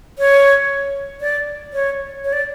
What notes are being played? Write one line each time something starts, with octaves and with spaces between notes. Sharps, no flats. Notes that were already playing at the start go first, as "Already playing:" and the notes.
C#5
D5
C#5
C#5
D5